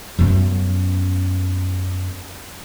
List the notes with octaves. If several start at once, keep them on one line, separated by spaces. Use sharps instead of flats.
F#2 B3